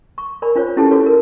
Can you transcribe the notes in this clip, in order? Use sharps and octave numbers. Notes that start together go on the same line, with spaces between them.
C#6
A#4 D5 G#5 B5
D4 F4 C5 C#5
C#4 E4 G4 A4 B4 A5
F#4 A4 B4 C#5
A#4